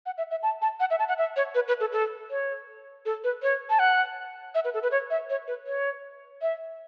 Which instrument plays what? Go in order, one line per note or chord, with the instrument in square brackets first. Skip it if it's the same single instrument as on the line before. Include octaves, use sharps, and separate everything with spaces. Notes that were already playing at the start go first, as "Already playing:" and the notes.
[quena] F#5
E5
E5
A5
A5
F#5
E5
A5
F#5
E5
C#5
B4
B4
A4
A4
C#5
A4
B4
C#5
A5
F#5
E5
B4
A4
B4
C#5
E5
C#5
B4
C#5
E5